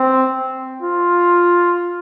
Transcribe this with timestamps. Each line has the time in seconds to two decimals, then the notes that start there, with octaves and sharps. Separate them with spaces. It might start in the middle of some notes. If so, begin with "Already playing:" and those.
Already playing: C4
0.82 F4